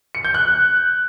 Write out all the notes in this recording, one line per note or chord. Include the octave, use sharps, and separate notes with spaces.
C#7
G6
F#6